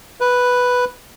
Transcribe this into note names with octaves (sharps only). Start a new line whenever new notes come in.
B4